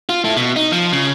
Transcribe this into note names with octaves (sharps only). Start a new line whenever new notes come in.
F4
E4 A4
B2
D#4
F3
C#3